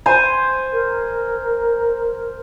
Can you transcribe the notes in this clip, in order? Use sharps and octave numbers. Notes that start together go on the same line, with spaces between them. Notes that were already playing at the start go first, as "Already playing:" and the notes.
C5 G#5 C6
A#4